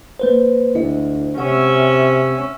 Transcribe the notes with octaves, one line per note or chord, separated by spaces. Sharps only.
A#3 B4 C5
D2 E4 D#5
C3 C#4 E5 F#5